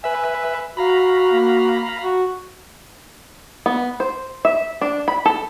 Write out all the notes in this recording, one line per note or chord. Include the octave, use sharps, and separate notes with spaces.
B4 E5 G#5
F#4 F5 A#5 B5
A#3
F#4
B3
C5
E5
D4
B5
A4